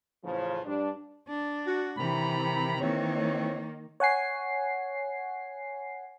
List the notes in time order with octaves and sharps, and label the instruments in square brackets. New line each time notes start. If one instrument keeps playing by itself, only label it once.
[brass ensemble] A1 C#3 F3
G2 D4
[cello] D4
[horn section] F#4
[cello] C3 E3 [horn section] D#3 A#5 B5
[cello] D#3 A#3 [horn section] E3 C4 C#5
[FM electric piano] C#5 F#5 G#5 C7